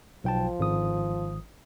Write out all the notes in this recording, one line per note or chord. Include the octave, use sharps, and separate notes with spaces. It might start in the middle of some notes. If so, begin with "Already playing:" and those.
B1 F3 G5 A5
G#1 D#6